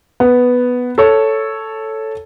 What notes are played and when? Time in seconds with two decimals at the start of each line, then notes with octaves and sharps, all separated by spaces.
0.20 B3
0.98 A4 C#5